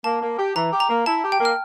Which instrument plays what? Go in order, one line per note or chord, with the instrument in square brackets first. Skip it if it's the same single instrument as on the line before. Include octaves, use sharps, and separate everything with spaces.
[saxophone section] A#3 [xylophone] A5
[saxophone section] A#3
G4
[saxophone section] E3 [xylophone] A#5
[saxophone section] G4
[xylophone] A#5
[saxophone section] A#3
[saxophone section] E4 [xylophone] A5
[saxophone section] G4
[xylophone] G5
[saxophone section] A#3
[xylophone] F6